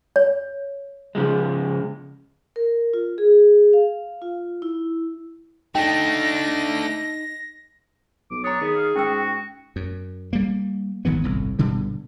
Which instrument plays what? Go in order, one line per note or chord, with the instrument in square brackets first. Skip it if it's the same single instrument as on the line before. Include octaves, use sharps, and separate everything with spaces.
[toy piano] C#5
[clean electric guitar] C#3 F3 G#3
[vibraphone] A#4
F4
G#4
F5
F4
E4
[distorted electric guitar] A3 D4 [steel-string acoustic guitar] D#4 [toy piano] G5 [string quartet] A#6
[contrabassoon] B1 [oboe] D6
[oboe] D4 [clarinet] C#5 [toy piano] A#5 D#6
[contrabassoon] D#3 [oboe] B3 [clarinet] G#4
[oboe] F5
[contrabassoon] G#2 [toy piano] C#4 G5 E6 [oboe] F#4
[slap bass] F#2
G3 A#3
G#1 D#3 E3 B3
G1 C2 A2
G1 B2 D3 G3